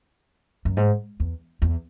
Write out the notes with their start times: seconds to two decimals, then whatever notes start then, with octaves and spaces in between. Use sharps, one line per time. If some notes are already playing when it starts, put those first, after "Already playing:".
0.65 F#2
0.77 G#2
1.20 E2
1.62 E2